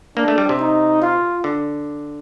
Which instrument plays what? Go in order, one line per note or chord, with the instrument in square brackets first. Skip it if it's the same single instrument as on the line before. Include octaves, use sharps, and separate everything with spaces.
[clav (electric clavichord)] A#3 [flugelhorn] D4
[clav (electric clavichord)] A3
G3
C3
[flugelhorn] D#4
F4
[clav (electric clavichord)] D3